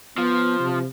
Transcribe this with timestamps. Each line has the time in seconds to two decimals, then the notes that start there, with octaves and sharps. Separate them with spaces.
0.18 F3 B3
0.60 C3